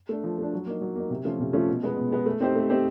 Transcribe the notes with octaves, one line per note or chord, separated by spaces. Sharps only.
A3 D4
F3
A3 D4
F#3
A#3 D#4
F#3
A#3 D#4
C3
F3 A3 C#4 F4
C3
F3 A3 C#4 F4
B2
G#3 B3
B2
G#3 B3
A3
C4 D#4 G4 C5
A3
C4 D#4 G4 C5